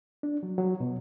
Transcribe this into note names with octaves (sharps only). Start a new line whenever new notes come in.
D4
F#3
F#3
B2